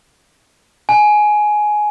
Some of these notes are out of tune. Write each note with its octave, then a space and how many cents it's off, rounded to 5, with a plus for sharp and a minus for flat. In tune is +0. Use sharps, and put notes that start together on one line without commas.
G#5 +15